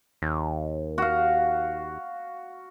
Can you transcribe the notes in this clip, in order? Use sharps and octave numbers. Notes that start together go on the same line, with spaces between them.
D#2
F#4 F5